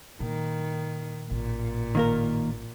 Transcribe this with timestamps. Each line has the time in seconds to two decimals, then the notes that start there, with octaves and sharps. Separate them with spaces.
0.20 A#2 D#3
1.31 A1 A#2
1.95 D#3 A#3 A#4